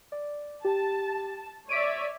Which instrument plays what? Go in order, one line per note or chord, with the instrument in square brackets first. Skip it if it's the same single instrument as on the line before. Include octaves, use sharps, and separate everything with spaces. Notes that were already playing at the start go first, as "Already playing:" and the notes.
[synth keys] D5
[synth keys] G4 [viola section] A5
[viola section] C#5 D5 E5 [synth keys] B6 D7 D#7